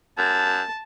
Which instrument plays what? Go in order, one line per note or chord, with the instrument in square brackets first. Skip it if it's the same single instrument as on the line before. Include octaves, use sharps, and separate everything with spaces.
[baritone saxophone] F#2 [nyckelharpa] A5